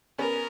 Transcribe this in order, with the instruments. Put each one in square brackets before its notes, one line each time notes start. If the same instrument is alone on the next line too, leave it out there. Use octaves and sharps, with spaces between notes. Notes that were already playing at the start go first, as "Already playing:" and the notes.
[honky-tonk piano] B3 C#4 [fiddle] A#4